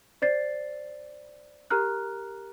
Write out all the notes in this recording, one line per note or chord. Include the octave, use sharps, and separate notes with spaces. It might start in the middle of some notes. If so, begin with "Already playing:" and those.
C5 D5 A6 C7
G4 A#4 A#5 F6 F#6